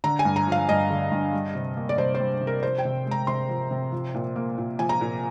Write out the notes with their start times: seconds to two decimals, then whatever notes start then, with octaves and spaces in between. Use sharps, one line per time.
0.04 D3 A#5
0.19 G#5
0.25 G2
0.36 A#5
0.47 F3 F5
0.69 G2 D#5
0.90 D3
1.11 G2
1.33 G3
1.55 C3
1.77 A#3
1.89 D5
1.97 C3 C5
2.15 G3 C5
2.41 C3
2.47 A#4
2.63 F3 C5
2.78 G5
2.85 C3
3.06 G#3
3.11 A#5
3.27 C3 C6
3.49 F3
3.71 C3
3.92 F3
4.15 A#2
4.36 A#3
4.58 A#2
4.79 F3 G#5
4.89 A#5
5.01 A#2